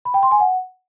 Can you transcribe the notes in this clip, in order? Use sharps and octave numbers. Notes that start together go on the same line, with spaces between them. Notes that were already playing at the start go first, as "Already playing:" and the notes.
B5
G5
C6
G#5
F#5